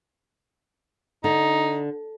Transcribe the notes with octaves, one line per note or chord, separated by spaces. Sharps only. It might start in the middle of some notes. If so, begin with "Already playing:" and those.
D3 D#4